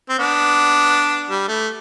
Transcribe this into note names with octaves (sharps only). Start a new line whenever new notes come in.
C4
B3 D4
G3
A3